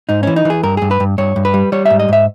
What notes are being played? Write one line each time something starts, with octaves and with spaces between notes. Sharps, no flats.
G#2 D#4
E3 C#4
D#4
E3 G#4
G2 A#4
G2 G#4
B4
G2
G2 C#5
G2
B4
G3
G3 C#5
G#2 E5
D#5
G#2 E5